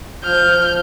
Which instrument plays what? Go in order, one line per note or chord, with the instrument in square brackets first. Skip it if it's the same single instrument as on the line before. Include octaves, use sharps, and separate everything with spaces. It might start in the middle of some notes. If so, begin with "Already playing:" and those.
[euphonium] F3 [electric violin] F6 [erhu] G6